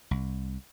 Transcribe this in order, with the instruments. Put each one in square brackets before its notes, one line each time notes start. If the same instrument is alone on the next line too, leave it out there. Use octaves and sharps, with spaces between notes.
[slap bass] C2